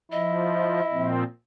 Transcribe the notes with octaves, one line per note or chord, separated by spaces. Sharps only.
F3 E4 D#5
A#2 F3 C4